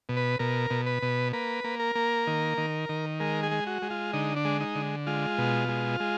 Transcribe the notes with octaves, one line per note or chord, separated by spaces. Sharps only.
B2
B4
B2 A#4
B2
B4
B2
A#3 B4
A#3
A#4
A#3
D#3
D#3
D#3
G#3 A#4
G#4
G#3
F#4
G#3
F4
D3 D#4
D4
G#3
D#4
D3
G#3 F4
B2
G#3
G#3